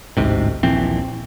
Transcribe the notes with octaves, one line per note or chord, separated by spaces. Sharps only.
A1 D2 G#2 C3
D#1 A#1 E3 C4